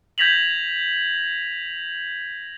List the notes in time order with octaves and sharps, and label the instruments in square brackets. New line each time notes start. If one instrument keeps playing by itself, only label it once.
[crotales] G6 G#6 A#6 B6 F7 F#7